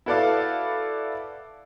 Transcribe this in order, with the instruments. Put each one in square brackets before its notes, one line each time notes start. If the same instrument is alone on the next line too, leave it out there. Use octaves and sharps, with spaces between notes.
[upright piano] E4 F#4 A4 B4 D5 F5